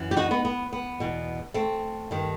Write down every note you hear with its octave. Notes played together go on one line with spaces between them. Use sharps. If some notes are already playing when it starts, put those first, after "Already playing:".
Already playing: F#2 E3
G4
D#4 F#4
B3 D#4
B3
B3
E2 B2
A3 C4
G2 D#3